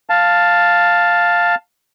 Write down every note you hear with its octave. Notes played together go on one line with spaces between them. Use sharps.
F5 A5